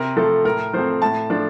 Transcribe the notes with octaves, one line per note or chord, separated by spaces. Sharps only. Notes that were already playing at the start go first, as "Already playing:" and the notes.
Already playing: C3 A#4
F3 A3 A4
A2 A#4
F3 A3 C4 C5
A2 A5
F3 A3 D4